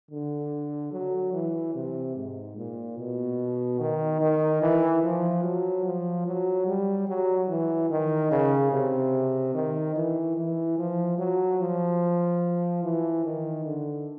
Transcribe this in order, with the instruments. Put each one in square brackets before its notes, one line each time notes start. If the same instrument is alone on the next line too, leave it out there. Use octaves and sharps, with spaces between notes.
[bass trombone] D3
F#3
E3
C3
G#2
A#2
B2
D#3
D#3
E3
F3
F#3
F3
F#3
G3
F#3
E3
D#3
C#3
C3
D#3
E3
E3
F3
F#3
F3
E3
D#3
D3